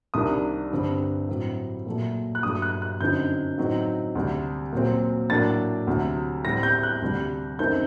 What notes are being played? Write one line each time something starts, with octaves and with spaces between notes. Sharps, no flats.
C2 C3 D#3 G3 D4 D#6
G2 D3 G3 C4
A2 F#3 C4
A#2 F#3 A3
F#6
G2 F#3 A3 D#6
F#6
F#6
F#2 D3 F#3 C4 D#4 G6
A2 F#3 C4 D#4
D2 C3 G3
A#2 F#3 C4
A2 F#3 A#3 D4 A6
D2 C3 F#3
A2 G3 C4 A#6
G6
F#6
D2 C3 G3
F#2 D#3 A3 C4 D#4 G6